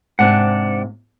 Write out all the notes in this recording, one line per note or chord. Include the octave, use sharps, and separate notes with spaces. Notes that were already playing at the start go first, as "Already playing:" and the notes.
G#2 C3 D4 G4 F#5